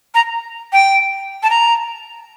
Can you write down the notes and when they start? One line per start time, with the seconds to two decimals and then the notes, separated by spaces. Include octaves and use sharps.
0.15 A#5
0.73 G5
1.43 A5
1.50 A#5